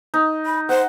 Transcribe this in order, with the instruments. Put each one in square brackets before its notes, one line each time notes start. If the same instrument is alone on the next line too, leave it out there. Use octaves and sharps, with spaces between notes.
[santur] D#4
[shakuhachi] B5
[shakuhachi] C5 [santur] F#5